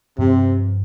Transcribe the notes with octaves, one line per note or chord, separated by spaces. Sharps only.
G2 C3 F3 B3